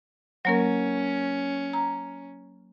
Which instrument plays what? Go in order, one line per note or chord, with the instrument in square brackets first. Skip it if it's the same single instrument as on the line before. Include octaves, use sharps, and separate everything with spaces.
[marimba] F#3 A#3 A#4 [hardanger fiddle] C#4
[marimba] A#5